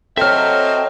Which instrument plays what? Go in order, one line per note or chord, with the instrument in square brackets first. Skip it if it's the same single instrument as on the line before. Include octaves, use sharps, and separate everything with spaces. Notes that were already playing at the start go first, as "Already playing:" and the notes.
[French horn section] F#3 D#5 [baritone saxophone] C4 [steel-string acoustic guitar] A4 C#5 [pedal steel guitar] E5 F6